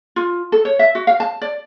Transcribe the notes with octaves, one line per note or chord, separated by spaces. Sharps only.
F4
A4
C#5
E5
F#4
F5
A5
D5